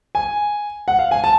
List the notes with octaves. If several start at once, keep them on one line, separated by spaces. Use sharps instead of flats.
G#5
F#5
F5
G#5
A5